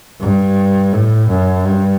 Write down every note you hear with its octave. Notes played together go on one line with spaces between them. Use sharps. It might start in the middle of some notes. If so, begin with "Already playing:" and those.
G2
A2
F#2
G2